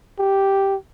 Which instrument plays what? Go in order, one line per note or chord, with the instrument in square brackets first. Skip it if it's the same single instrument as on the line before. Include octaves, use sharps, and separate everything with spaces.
[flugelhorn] G4